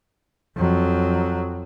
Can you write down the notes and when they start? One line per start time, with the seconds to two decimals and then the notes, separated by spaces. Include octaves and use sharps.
0.57 F2 F#3